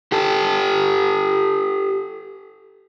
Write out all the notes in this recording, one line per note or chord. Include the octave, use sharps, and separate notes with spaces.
G4 A4